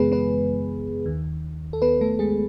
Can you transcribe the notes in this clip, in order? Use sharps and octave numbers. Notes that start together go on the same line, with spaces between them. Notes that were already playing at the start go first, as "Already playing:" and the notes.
Already playing: F#2 C#3 E3 G#3 B3 G#4 B4
B3 B4
D#2 D#3
A4
B3 B4
A3 A4
G#3 G#4